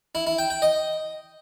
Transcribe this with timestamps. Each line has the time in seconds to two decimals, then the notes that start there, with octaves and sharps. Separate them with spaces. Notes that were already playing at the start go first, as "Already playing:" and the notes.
0.15 E4
0.27 E4
0.38 G5
0.50 G5
0.62 D#5